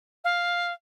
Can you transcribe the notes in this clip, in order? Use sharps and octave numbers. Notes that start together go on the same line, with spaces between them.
F5